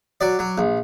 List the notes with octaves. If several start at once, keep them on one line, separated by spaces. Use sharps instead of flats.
F#3 D5
F#3
A#1